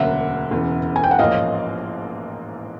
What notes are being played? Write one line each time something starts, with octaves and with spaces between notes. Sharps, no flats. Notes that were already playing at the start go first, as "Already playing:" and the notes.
Already playing: E1 D2 C#3 F#3 A#3 E5 F#5
E1 E2 C#3
G#5
G5
F#5
A1 G#2 F3 A#3 C#4 D#5 F5